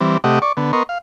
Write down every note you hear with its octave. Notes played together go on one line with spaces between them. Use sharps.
E3 G3 C4
C3 A3 G4 D#5 F#5
D5 C#6
D3 B3
B3 A#4 D#5 C6 C#6
F5